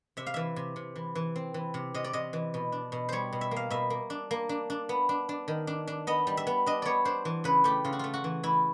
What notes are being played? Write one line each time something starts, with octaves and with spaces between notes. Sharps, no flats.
C3 E5
F5
E3 E5
C3
C3
E3
E3
C4
E3
C3
C3 D#5
D5
C3 D#5
E3
B2
D4
B2
G3 C5 C#5
B2
E5
A#3
F5
B2 E5
A#3
D4
A#3
D4
D4
B3
D4
D4
D#3
D4
D4
B3 D#5
G3
E5
B3
D4 D#5
B3 C#5 D5
D4 C5
E3
C#3 B4
A3 G4
C#3 F4
F#4
A3 F4
F#4
E3
E3 E4